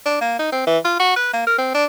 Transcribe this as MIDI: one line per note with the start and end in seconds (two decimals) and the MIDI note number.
0.06 0.18 62
0.21 0.39 58
0.39 0.48 63
0.52 0.65 60
0.67 0.78 52
0.85 0.95 65
1.00 1.16 66
1.16 1.31 71
1.33 1.42 58
1.47 1.55 70
1.58 1.70 60
1.74 1.85 62